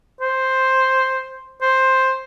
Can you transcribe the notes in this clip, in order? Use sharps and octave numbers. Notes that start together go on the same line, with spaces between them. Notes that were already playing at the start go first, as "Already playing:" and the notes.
C5
C5